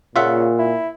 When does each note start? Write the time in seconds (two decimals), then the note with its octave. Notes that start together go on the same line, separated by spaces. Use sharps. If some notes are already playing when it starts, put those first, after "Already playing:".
0.16 A#2 C#3 F4 E5 F#5
0.58 E4